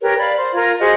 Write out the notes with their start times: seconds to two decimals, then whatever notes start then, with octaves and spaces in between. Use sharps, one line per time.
0.01 G4 A#4 B4 C#5
0.18 D5 F5 B5
0.35 C5 F5
0.55 F4 A#4 A#5 G#6
0.80 F#4 G#4 C5 D#5